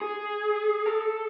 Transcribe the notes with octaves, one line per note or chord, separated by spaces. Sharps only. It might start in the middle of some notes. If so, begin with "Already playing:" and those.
G#4
A4